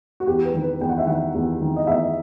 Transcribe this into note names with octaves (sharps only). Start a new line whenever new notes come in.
F#4
E2 G4
B4
D#3
B4
E2 G5
F#5
E5
D#3 F#5
E2
D#3
D#5
E2 E5